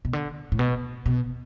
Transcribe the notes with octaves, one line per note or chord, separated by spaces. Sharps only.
B2
D3
A2
B2
B2